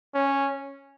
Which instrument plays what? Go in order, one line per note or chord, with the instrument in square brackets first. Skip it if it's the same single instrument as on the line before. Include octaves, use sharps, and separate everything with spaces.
[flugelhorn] C#4